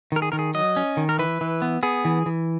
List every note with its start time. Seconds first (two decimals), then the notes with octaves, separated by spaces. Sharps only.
0.12 D#3 A#4
0.22 G#4
0.32 D#3 A#4
0.39 G#4
0.54 F#3 D#5
0.76 C#4
0.97 D#3
1.09 A#4
1.19 E3 B4
1.41 E3
1.62 B3
1.83 B3 G#4
2.05 E3
2.26 E3